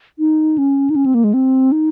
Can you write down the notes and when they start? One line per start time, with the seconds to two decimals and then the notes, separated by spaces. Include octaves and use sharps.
0.19 D#4
0.58 C#4
0.90 D#4
0.96 C#4
1.06 C4
1.14 A#3
1.24 G#3
1.34 C4
1.72 D#4